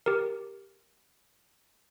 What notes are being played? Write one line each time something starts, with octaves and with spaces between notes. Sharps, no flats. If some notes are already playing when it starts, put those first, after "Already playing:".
G4 A#4